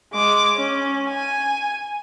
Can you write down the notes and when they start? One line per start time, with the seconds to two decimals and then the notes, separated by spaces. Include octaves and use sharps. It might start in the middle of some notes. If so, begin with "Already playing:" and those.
0.14 G#3 D6
0.57 C#4
1.09 G#5